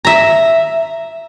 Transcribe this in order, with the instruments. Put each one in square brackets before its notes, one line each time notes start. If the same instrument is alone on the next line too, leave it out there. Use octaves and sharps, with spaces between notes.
[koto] E5 A#5